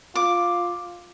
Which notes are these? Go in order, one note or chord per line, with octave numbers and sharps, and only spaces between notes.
F4 D6